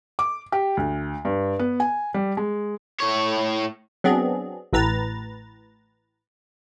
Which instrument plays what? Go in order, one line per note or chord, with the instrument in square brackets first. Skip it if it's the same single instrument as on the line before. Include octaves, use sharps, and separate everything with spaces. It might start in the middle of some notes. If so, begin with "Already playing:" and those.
[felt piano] D6
G4
D2
G2
B3
G#5
G3
G#3
[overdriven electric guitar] A2 C#5
[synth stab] F#3 B3 C4 D4 G#4
A1 A2 B4 A#5 A6